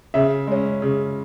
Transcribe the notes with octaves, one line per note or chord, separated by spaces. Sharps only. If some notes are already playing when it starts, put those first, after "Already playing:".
C#3 E5
G#3 C#4
C#3